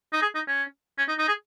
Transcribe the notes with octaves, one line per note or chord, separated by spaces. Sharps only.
D#4
G#4
D#4
C#4
C#4
D#4
D#4
G#4